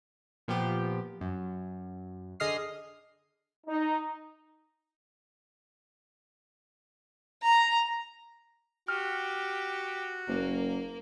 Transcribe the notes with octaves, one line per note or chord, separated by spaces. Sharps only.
A#2 F3 B3 G4
F#2
D3 G#4 D#5 D#6 F6 C7
D#4
A#5
F#4 G4 F6
F#1 A#3